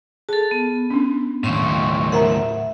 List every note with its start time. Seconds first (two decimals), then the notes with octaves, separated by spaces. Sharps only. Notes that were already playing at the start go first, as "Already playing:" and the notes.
0.29 G#4 A4 A5
0.51 B3
0.90 C#4 D4
1.44 D#2 A2 C6 C#6
2.12 A#4 C5 E5 F#5 A#5